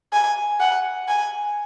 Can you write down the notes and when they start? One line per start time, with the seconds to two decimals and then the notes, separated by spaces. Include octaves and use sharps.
0.13 G#5
0.60 F#5
1.08 G#5